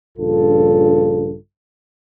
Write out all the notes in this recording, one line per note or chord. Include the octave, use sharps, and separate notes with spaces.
A#1 G2 C#3 F4 A4